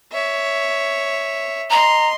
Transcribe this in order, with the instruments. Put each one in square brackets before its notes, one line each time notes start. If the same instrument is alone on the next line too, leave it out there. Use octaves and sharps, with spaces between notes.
[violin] C#5 E5
[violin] D#5 C6 [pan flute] A#5